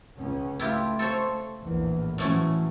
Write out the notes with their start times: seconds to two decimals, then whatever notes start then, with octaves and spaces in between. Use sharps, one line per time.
0.15 C#2 C#4
0.60 A3 E4 F4 G4
0.99 A4 C5 C#5
1.61 A#1 E2 A2
2.18 A2 E3 F#3 A3 C#4